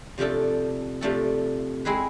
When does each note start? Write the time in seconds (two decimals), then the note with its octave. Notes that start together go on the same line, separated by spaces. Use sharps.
0.18 C3 F3 A3 D4 A4
1.01 C3 F3 A3 D4 A4
1.85 G#3 C4 E4 G#4 B4